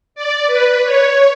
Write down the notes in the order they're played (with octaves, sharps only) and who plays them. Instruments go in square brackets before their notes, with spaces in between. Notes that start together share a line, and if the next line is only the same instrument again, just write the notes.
[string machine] D5
B4
C#5